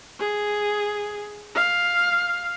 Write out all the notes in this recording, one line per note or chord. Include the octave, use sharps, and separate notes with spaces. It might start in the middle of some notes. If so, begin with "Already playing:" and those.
G#4
F5